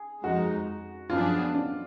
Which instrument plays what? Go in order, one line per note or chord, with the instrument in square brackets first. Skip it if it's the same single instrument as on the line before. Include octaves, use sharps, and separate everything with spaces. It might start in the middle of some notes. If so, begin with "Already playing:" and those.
Already playing: [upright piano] G#4
[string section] F2 F3 G#3 D#4 [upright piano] F#4
[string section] F#2 F3 B3 D4 G#4 [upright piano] F4
[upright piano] D4